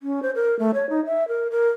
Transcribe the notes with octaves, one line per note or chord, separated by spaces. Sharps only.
C#4
C5
A#4
A3
C#5
D#4
E5
A#4
A#4